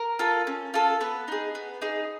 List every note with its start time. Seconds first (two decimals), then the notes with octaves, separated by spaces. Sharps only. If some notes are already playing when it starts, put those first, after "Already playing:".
Already playing: A#4
0.19 F4 A4
0.47 C#4
0.74 F4 A4
1.01 B3 B4
1.28 D#4 G#4
1.55 B3
1.82 D#4 G#4